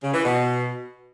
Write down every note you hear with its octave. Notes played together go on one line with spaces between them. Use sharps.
C#3
E3
B2